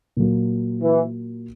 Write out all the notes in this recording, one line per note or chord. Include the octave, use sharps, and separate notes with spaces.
A#2 F#3 A#3
E3